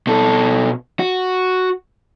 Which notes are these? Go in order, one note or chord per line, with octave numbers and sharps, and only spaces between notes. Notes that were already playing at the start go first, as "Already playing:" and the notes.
B2 A4
F#4